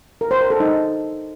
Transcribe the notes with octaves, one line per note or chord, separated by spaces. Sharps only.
A#4
C5
A#4
A4
D#4